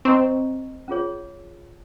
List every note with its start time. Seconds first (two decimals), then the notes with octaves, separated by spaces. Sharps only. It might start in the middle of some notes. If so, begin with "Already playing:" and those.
0.05 C4 C5 D#5 A#5 C#6
0.88 C#4 F4 G#4 C#5